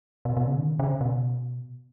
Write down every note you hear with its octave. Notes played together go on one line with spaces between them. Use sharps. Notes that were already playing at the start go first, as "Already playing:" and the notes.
B2
B2
C#3
D#3
C#3
B2